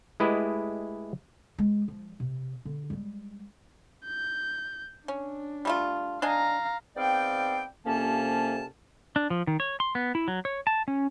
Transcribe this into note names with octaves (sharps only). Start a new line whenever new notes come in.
G#3 A3 E4 G4 B4 D#5
G#3
F3
C3
D3
G3 G#3
G6
C#4 D4
G3 A3 F4
D4 D#5 F5 G#5 A#5
G#2 B3 C4 D5 F5 G5
C2 F2 C3 A#3 C#4 A5
D4
F3
D#3
C#5
C6
B3
E4
F#3
C#5
A5
C#4